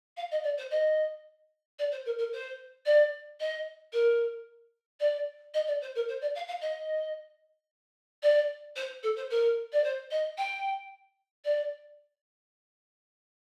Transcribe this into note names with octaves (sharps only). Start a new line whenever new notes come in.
F5
D#5
D5
C5
D#5
D5
C5
A#4
A#4
C5
D5
D#5
A#4
D5
D#5
D5
C5
A#4
C5
D5
F5
F5
D#5
D5
C5
A4
C5
A#4
D5
C5
D#5
G5
D5